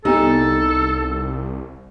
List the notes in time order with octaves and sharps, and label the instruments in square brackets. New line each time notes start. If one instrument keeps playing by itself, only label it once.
[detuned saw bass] C2 [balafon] B3 G4 [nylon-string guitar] D#4 [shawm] A4